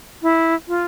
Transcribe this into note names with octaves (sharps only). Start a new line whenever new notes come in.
E4
F4